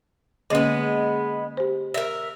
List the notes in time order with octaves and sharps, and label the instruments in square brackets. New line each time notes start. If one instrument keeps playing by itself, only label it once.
[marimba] D3 A#3 C#4 [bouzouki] G#3 B3
[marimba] G4 C5
[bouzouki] A#4 E5